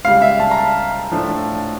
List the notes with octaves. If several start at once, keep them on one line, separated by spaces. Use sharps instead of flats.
C#2 C#3 G3 F5
E5
A5
A#5
A5
A2 F3 A3 D4